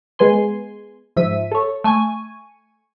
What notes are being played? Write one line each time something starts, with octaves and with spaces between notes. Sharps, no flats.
G#3 B3 G#5 C6
G#2 F3 E5 B6 D#7
A4 C#5
A3 G#5 C#6 G#6 D#7